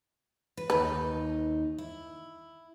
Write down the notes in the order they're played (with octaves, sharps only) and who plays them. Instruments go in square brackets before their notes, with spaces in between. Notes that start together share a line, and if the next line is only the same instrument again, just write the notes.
[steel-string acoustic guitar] B4
[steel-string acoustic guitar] D#2 D#4 [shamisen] B4
[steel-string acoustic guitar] E4